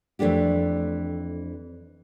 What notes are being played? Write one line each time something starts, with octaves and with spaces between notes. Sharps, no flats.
F2 E3 A3 D4 G4